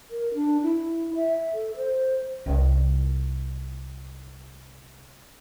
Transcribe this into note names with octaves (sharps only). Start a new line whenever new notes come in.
A#4
D4
E4
E5
A4
C5
C2 F4